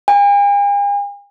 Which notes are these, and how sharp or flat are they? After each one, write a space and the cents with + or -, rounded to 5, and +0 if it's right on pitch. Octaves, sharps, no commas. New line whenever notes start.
G#5 -45